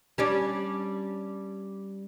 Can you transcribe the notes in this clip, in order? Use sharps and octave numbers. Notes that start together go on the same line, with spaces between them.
G3 C#4 D4